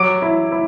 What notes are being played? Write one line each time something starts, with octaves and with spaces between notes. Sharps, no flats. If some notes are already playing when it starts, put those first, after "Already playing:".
Already playing: F#3 D6 D7
E4
E4